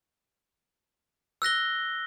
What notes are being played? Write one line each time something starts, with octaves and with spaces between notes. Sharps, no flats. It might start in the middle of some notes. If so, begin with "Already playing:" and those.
E6 F#6 A#6 G7